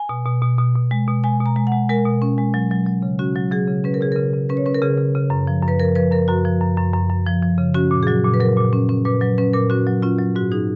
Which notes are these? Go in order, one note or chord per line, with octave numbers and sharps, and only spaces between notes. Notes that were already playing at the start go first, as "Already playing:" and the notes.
Already playing: G#5
B2
B2
B2
B2
B2
G#3
B2
G#3 G#5
B2
A#5
G#3
F#5
G#3
G#3 A#4
B2
C#4
G#3
F#3
F#3
F#3
C#3
C#4 F#4
F#3
F#3 G#4
C#3
C#4 B4
A#4
C#3 G#4
C#3 A#4
C#3
C#4 B4
C#5
C#4 B4
A#4
C#3 G#4
C#3
C#3
F#2
F3
F#2 B4
F3 A#4
F3 B4
F#2 A#4
F#2 F#4
F3
F#2
F#2
F#2
F#2
F3
F3
C#3
C#4 F#4
A#2
G#4
F#3 F#4
A#2
B4
F#3 A#4
A#2
C#4
C#4
A#2 B4
F#3 B4
C#4 B4
A#2 A#4
C#4 F#4
F#3
C#4 F4
F#3
G#2 F#4
D#4 G#4